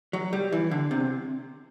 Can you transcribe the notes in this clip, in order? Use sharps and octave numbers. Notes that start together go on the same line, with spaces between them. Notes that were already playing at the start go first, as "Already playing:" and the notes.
F#3
G3
E3
D3
C3